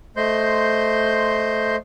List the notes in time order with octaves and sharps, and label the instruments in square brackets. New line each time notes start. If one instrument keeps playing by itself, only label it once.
[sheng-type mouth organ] A3 C5 D#5 C6 G6